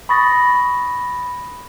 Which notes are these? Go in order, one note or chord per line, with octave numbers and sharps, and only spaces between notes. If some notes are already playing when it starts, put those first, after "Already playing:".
B5 C#6 D#6 A6 A#6